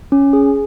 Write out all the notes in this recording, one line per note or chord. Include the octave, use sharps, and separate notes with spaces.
C#4
G#4